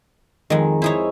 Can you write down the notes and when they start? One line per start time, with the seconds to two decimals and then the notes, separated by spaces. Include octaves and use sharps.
0.50 F2 D#3 G#3
0.82 D#4 E4 G#4 C5 C#5